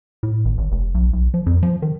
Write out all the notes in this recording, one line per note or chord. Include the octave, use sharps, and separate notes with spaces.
A2
G#1
G#1
F1
B1
B1
F3
F2
F3
D#3